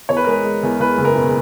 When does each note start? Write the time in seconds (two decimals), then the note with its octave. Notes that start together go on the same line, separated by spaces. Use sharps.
0.09 E2 C#5
0.17 B4
0.24 A#4
0.27 G#3 B4
0.44 G#3
0.63 E2
0.80 E2 B4
0.98 F#1
1.05 A#4
1.15 B2